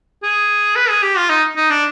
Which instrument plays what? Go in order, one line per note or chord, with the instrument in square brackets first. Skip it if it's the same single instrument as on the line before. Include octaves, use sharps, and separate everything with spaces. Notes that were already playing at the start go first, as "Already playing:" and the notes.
[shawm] G#4
B4
G#4
G4
F4
D#4
D#4
D4